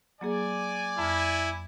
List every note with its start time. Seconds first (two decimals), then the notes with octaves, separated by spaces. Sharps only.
0.21 F#3 A#3 G#4 D5 G#5
0.99 F2 E4 F6